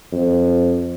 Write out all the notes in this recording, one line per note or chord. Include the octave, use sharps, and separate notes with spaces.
F2